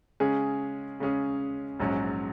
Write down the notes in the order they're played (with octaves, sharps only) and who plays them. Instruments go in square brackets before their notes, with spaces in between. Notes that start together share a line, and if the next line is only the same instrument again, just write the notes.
[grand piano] C#3 G#3 C#4 G#4
C#3 G#3 C#4 G#4
A#1 G#2 F#3 C#4